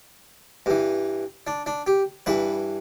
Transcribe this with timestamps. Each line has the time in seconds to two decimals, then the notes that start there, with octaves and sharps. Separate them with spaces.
0.66 G2 E3
1.47 D4
1.66 D4
1.87 G4
2.26 G2 E3 B4